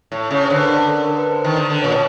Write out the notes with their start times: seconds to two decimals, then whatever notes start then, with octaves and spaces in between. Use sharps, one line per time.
0.12 A2
0.31 C#3 C#5
0.44 C5
0.50 D3
0.56 B4
0.68 A#4
0.88 A4
1.06 A#4
1.19 B4
1.31 C5
1.44 D#3
1.56 D3
1.70 D3
1.82 A#2 C#5
1.92 B2